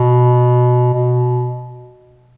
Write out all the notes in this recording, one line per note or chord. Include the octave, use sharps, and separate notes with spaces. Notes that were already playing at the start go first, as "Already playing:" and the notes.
Already playing: B2
B2